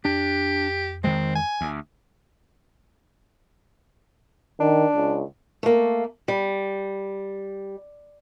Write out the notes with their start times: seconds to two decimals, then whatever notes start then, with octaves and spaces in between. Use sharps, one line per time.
0.05 F2 D4 G4
1.04 D#3 G#3 C4
1.35 G#5
1.61 D2
4.60 D#3 D4
4.95 C#2
5.63 A3 A#3
6.28 G3